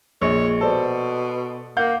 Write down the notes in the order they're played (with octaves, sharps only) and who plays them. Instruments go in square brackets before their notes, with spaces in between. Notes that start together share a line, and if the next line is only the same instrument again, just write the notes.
[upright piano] A#1 G#3 [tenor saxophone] C#5
[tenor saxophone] B2 [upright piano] A4 C5 D5
[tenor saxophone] A#3 [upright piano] F5 F#5 G6